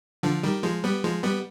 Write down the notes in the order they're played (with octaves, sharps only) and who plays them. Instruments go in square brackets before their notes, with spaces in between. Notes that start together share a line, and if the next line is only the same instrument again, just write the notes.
[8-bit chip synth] D3 F3
D#3 G3
F3 G#3
G3 B3
F3 G#3
G3 B3